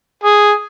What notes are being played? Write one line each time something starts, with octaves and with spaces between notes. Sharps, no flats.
G#4